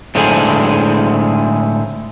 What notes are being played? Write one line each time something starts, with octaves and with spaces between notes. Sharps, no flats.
A2 D3 G#3 C4 D#4 G#4